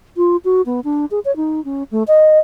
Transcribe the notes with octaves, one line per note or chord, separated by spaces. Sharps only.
F4
F#4
B3
D4
G#4
C#5
D#4
C#4
A3
D#5